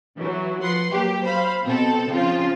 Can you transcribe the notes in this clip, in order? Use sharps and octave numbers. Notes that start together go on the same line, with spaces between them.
E3 F#3
F3 B4 F#5 C6
F#3 A#3 G4
C5 F5 B5
B2 C4 A4
C#3 F3 C4 F4